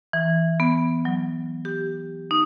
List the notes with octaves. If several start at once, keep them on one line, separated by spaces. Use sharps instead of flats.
E3
B3
F#3
G4
D#4